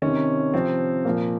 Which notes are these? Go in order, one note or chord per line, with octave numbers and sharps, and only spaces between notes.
C3 D#3 C#4
C3 F3 C4
A#2 F3 A#3